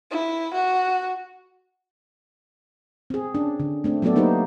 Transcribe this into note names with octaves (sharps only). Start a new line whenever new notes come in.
E4
F#4
C4 G#4
C#4 D4
D3
A3 C4 D4
F#3 A3 B3 F#4 A4 D5
A#3 D#4 G4 B4 C5